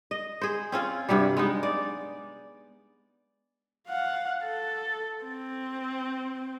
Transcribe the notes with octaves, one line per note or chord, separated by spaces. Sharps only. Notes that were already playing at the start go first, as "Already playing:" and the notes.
D#5
G#4 C5
C4 C#4 F4
G2 C3 F#3 G3
G#3 B3 D#4
D5
F5 F#5
A4
C4